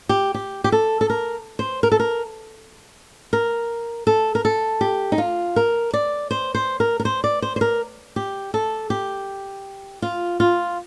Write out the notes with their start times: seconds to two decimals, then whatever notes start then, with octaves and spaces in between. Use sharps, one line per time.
0.09 G4
0.34 G4
0.64 G4
0.72 A4
1.01 A4
1.10 A#4
1.59 C5
1.83 A#4
1.92 A4
2.00 A#4
3.33 A#4
4.07 A4
4.35 A#4
4.45 A4
4.81 G4
5.12 D#4
5.18 F4
5.56 A#4
5.93 D5
6.31 C5
6.55 C5
6.80 A#4
7.00 A#4
7.05 C5
7.24 D5
7.42 C5
7.56 C5
7.61 A#4
8.16 G4
8.54 A4
8.90 G4
10.02 F4
10.40 F4